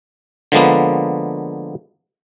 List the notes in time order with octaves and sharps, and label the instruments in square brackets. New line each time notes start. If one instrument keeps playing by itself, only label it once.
[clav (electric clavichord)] D3 F3 G#3 A#3 B3